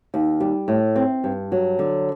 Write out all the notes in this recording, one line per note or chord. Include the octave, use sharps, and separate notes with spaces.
D#2
G3
A2
C4
G2
F#3
D3